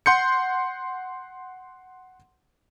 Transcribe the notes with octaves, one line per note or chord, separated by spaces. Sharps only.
F#5 C6 G6 C#7